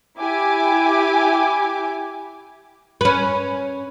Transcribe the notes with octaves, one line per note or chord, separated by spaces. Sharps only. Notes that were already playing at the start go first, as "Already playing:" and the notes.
E4 G4 G#5 D6
C#4 B4